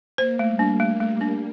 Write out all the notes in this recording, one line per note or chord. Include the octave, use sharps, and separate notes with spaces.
A#3 C5
A3
G3
D4
A3
A3
D4